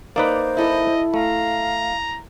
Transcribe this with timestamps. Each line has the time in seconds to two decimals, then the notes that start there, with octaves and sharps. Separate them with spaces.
0.16 A#3 D#4 B4 C5 D5 F#5 A#5
0.57 E4 A4 D#5
1.14 A3 F5 A#5